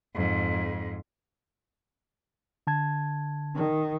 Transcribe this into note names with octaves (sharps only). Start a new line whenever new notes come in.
F2 G#2
D3 A5 G#6
D#3